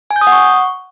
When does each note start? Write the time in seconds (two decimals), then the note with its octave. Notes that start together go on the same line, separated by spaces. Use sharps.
0.11 G#5
0.16 G6
0.21 D#6
0.27 F#5
0.32 C#6